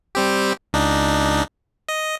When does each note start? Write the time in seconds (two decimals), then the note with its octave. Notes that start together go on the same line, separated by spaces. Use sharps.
0.15 G3 C4 G4
0.73 C#2 D4 D#4
1.89 D#5